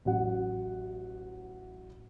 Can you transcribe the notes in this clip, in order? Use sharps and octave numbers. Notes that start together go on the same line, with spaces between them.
A1 F#3 F#5